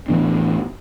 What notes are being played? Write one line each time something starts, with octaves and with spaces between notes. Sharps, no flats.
A2 E3 B3 D4